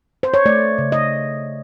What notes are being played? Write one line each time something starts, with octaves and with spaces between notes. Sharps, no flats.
C5
C#5
A3 D5
C#3
D#5